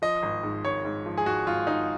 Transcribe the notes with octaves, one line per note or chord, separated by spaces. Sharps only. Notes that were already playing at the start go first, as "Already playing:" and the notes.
F3 D#5
G#1
G#2
G#1 C#5
G#2
F3
G#4
G#2 F#4
G#1 F4
G#1 D#4